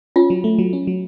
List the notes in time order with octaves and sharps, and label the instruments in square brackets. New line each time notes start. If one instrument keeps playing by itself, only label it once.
[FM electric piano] C#4 [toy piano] F4
[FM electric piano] F#3
A3
F#3
C#4
F#3